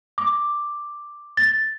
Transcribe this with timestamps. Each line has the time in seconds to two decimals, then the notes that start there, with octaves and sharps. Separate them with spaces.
0.18 D6
1.37 A6